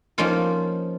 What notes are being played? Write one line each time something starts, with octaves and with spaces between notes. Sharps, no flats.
F3 A#3 C#4 D#4 F4